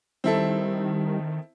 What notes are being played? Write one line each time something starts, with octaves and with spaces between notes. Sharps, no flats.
D#3 G3 C4 E4 A4